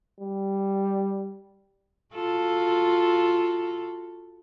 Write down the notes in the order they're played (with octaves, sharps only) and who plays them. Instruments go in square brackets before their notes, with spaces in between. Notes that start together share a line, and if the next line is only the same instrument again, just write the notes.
[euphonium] G3
[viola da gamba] F4 F#4 A4